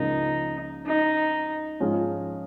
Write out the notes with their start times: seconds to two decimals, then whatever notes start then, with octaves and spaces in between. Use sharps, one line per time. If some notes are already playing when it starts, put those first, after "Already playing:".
Already playing: C#2 C#3 F3 A#3 D#4
0.86 D#4
1.80 G#2 F3 C#4 F4 G#4